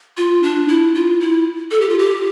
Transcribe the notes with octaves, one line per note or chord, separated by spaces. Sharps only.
F4
D4
E4
F4
E4
A4
G4
F4
G4